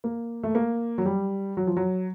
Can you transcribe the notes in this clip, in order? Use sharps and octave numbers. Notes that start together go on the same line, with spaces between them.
A#3
A3
A#3
F#3
G3
F#3
F3
F#3